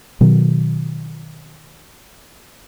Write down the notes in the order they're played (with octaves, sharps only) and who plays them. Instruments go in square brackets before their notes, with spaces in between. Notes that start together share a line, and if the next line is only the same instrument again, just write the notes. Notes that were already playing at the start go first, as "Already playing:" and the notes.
[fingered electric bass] B2 D#3 F#3